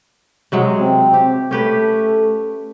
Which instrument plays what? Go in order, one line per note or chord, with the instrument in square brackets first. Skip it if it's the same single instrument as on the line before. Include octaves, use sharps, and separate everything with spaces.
[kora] C3 F#3 G#3
[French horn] C4
[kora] G4
[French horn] A3 [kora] C#4 G4 B4